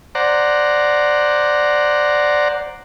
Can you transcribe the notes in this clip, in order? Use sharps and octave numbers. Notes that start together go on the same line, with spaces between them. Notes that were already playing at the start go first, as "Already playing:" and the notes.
C5 D5 F#5 A#5